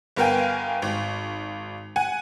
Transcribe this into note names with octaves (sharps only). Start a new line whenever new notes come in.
G1 B3 A#4 F5 G5 G#5
G#1
F#5 G#5